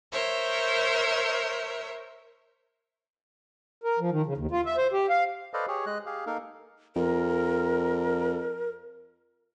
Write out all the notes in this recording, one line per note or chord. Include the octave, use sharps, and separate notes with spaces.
A#4 C5 C#5 E5
A#4
F3
D#3
C#3
D#2
F4
E5
C5
G4
F5
A4 B4 C5 D5 D#5 F5
G4 G#4 C#5
G#3 D#5 F#6
G4 G#4 F5
A#3 D#4 A4 A#4 F5
F2 A#4